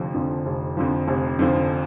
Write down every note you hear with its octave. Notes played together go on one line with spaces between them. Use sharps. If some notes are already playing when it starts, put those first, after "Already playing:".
Already playing: F1 F2 D3 F3
F2 D3 F3
F1
F2 D3 F3
F1
F2 D3 F3